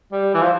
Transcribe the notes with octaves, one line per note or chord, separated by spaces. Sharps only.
G3
E3
F3